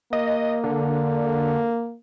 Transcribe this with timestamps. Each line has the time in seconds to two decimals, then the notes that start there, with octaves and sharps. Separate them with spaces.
0.13 A#3 D#5
0.64 D3